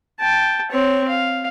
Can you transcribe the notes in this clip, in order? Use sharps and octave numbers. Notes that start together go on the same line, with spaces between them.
G5 A5
C4 C#5
F5